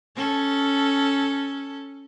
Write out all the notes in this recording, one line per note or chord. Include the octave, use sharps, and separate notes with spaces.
C#4 A4